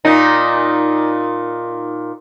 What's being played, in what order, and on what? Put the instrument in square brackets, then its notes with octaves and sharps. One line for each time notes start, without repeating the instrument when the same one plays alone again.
[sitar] A#2 D#4